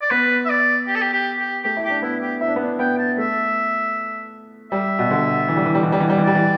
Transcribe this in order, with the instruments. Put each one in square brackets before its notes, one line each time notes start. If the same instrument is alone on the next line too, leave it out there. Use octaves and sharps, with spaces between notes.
[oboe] D5
[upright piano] B3 [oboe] B4
[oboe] E5
D5
G4
A4
G4
G4
G4
[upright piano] A3 [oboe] G4
[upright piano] E4
[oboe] G4
[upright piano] D4
[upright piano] B3 [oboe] E4
[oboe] G4
[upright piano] E4 [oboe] E5
[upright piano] D4
B3
D4
[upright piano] B3 [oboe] G5
[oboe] A5
[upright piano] A3 [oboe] E5
[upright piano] G3 [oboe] E5
[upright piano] B2
D3
E3
G3
E3
G3
E3
G3
E3
G3
E3
[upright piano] G3 [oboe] D5
[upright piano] E3